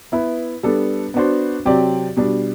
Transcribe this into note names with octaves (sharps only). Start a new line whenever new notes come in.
B3 E4 B4
G3 B3 D4 A4
B3 D4 F#4 C5
C3 F#3 C4 G4 D5
B2 G3 D4